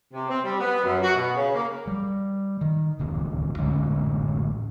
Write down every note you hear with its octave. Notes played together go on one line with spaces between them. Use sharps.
C3
C4
G3
B3
F#2
F#4
B2
C#3
A#3
G3
D#3
D1 C#2 D#3
A1 D3 G#3 C#4